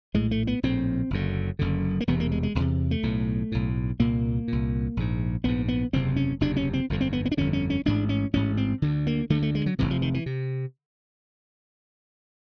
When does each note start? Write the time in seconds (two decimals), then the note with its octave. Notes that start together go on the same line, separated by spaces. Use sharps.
0.14 A#1 A2 G#3
0.31 A3
0.47 B3
0.63 A#1 A2 C4
1.10 F#1 F#2 D3
1.59 F#1 F#2 D3
2.01 A#3
2.07 E1 E2 C3 B3
2.20 A#3
2.32 G#3
2.43 G#3
2.55 E1
2.58 E2 C3
2.91 A3
3.03 B1 A2
3.52 B1 A2
4.00 C2 A#2 A#3
4.48 C2 A#2
4.97 A#1 G#2
5.44 A#1 G#2 B3
5.68 B3
5.93 F#1 E2 C3 C4
6.16 C#4
6.41 F#1 E2 C3 D4
6.57 C#4
6.73 C4
6.90 G1 F2 D3
7.01 C4
7.13 B3
7.25 B3
7.32 D4
7.37 G1 F2 D3 C#4
7.53 C#4
7.70 C#4
7.85 A1 G#2 D4
8.09 C#4
8.33 A1 G#2 C#4
8.57 C4
8.82 D2 D3
9.07 A#3
9.30 D2 D3 A3
9.42 A3
9.55 G#3
9.66 F#3
9.79 F1 F2 C3 E3
9.91 F3
10.02 D#3
10.14 E3
10.26 C3